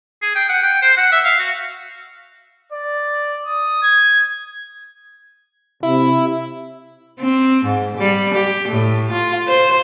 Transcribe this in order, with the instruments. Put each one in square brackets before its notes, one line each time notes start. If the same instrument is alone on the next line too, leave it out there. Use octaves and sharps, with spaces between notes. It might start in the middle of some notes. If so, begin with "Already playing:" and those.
[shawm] G#4
G5
F#5
G5
C5
F#5
E5
F5
F#4
[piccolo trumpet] D5
D#6
G#6
[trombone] C3 [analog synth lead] E4
[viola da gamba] C4
G#2
G3
G4
A2
F4
C5